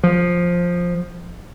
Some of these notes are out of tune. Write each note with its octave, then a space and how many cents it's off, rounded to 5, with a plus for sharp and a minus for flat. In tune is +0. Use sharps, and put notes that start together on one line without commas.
F3 +10